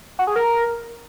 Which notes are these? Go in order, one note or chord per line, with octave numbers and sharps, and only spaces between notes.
F#4
G#4
A#4